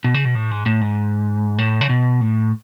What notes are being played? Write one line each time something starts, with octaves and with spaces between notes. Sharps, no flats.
B2
C#3
B2
A2
G#2
A2
G#2
A2
C#3
B2
A2